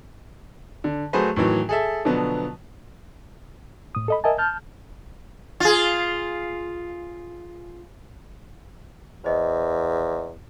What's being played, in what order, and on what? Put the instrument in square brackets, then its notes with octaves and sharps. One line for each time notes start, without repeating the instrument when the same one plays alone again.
[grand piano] D3
F#3 A3 F#4 G#4 B4 C5
A2 D#3 E3 F#3
G#4 A4 E5
B2 D3 F3 F#3 B3
[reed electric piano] A2 D#6
A4 D#5 B5
A#4 D#5 E5 G#5 A5
A5 F6 G6
[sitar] F4 G#4
[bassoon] E2 [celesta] C5 D#5